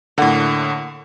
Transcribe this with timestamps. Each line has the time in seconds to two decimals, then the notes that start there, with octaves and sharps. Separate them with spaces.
0.18 A2 D3 A#3 F#5